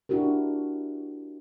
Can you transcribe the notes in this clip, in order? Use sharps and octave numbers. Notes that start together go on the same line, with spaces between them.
D4 E4 F#4 G4 A#4